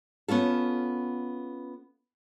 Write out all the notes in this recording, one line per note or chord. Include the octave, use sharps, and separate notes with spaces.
B3 C#4 F4 A4